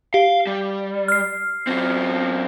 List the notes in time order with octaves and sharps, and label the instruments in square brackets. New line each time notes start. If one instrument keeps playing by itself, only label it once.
[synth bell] G4 [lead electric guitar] F5
[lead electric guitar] G3
[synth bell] F6 C7
[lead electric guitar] F#2 C4